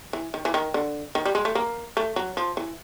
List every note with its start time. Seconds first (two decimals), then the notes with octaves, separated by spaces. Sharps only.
0.13 E3
0.34 D#3
0.45 E3
0.54 D#3
0.74 D3
1.15 D#3
1.25 G3
1.35 G#3
1.45 A3
1.55 A#3
1.97 A3
2.16 F#3
2.37 F3
2.57 E3